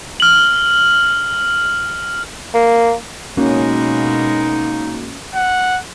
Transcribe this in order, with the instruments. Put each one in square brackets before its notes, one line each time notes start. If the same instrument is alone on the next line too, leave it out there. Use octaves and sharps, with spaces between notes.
[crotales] F6 F#7
[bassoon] A#3
[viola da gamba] B2 G#3 [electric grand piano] A#3 F#4 [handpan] C#4 [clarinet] D#4
[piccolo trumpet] F#5